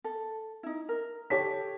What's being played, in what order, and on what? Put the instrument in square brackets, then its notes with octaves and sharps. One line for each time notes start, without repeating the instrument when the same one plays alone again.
[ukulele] A4
D#4 E4
A#4
[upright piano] G4 C#5 B6 [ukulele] A4